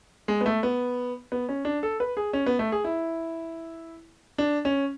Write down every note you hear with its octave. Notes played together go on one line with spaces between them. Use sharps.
G#3
B3
A3
B3
B3
C#4
D4
A4
B4
G#4
C#4
B3
A3
G#4
E4
D4
C#4